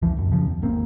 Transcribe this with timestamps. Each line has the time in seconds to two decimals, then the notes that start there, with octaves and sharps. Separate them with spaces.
0.02 F1 C#2 E3 F3
0.17 D1 F#2
0.32 F#2 C#3 F3
0.46 E2
0.62 G#1 A#3 C4